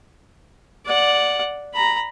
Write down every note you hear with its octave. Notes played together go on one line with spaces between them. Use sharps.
D5 F#5
A#5 B5